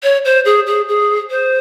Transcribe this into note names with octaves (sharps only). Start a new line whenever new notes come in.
C#5
C5
G#4
G#4
G#4
C5